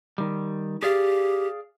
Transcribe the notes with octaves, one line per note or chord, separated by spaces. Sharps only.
D#3 G3
G4 G#4 D5 F5